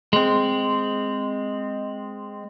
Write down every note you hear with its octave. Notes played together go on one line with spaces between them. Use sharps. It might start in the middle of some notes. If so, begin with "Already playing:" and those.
G#3 C4